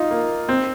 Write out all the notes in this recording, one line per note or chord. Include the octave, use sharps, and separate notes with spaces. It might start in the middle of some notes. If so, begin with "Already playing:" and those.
Already playing: D#4 F4
A#3
C4